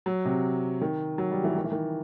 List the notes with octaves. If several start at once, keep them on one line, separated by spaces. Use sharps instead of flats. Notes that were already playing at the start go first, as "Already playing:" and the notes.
F#3
C3
D#3
F#3
G3
E3
D#3
E3
D#3